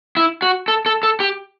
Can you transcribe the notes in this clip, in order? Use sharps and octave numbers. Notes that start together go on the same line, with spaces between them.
E4
F#4
A4
A4
A4
G4